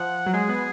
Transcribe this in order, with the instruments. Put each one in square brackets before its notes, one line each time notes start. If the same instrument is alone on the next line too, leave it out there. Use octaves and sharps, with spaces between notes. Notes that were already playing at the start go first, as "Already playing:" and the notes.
Already playing: [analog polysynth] F3 [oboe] F#5
[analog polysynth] F#3
[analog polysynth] G#3 [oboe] G#4
[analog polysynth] B3